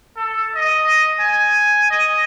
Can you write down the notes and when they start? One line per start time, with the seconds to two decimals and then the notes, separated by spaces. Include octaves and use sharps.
0.17 A4
0.55 D#5
1.20 G#5
1.91 D#5